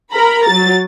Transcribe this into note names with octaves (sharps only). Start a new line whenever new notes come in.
A#4 A#5 B5
F#3 A6